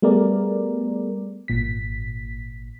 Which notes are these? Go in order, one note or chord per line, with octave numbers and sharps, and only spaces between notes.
G3 A3 B3 G#4 A#4 D5
G#1 A#2 B6